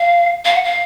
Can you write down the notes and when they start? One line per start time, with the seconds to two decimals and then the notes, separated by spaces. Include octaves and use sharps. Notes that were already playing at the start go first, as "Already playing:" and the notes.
Already playing: F5
0.45 F5
0.54 F#5
0.64 F5